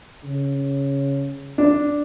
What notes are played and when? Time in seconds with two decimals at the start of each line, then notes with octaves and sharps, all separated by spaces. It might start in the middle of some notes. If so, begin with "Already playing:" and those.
0.24 C#3
1.58 D4